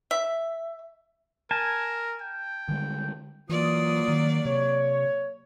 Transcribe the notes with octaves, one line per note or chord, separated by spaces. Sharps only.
E5
A#4 G#5 A5
G5
D3 G3 G#3
E3 F#3 A#3 F4 D5 D#6
D#3
C3 C#5